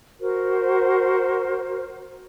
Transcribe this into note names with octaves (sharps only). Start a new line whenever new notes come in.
F#4 A#4 C5